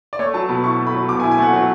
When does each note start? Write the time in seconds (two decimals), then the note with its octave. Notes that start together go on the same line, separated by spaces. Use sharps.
0.13 D5
0.19 A3 C#5
0.34 F#3 A5
0.49 B2 B5
0.64 E4 C#6
0.79 A3
0.86 B5
0.94 F#3
1.09 B2 D6
1.20 G#5
1.24 E4
1.31 G#5
1.39 A3 F#5
1.53 F#3